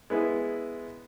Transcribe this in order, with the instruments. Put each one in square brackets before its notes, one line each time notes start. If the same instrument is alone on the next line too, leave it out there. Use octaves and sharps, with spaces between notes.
[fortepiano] G#3 B3 E4